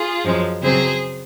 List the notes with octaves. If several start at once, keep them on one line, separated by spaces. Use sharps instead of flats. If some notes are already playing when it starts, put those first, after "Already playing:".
Already playing: F4 G#4
F#2 F3 G#3 C#4
C#3 F#3 C4 G#4 C5